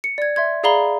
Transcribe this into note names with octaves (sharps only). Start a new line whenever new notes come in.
C#7
D5 G#6
E5 C6 G#6
G#4 D5 F5 A#5 B5 G7